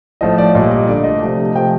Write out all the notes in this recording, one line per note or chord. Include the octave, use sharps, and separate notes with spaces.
A2 F3 A3 D#5
D5
A#2 G3 D#5
D#5
D3 A3 D5
D#5
C3 F3 A3
C3 F3 A3 G5